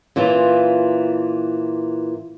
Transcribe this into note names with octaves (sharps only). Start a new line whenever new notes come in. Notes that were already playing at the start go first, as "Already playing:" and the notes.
A#2 E3 C#4 F4